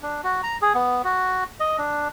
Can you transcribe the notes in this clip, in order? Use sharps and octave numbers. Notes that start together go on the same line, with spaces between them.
D4
F#4
A#5
G#4
B3
F#4
D#5
D4